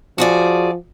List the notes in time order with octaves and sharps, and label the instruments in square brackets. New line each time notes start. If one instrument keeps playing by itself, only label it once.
[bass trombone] F3 [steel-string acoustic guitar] F#4 G#4 D5